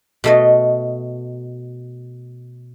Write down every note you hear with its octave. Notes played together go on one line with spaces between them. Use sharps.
B2 A3 D#5